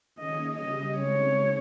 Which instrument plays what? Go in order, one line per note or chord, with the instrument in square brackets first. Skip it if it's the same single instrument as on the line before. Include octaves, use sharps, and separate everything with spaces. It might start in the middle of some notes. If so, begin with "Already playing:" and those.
[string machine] D#3 A#3 C#4 G#4 C#5 [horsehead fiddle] D#5
[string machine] C#3 G3 C#4 G4 [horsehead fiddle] D#5
[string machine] C#3 G#3 C4 D#4 [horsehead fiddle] C#5